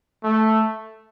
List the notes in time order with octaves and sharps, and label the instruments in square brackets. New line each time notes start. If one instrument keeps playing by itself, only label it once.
[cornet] A3